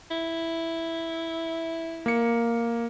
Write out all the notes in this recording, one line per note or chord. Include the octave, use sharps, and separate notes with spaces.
E4
A#3 C#7